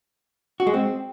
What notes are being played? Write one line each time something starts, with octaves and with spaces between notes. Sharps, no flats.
F#4
G#3
C4